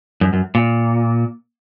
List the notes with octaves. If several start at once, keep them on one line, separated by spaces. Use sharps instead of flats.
F#2
F#2
A#2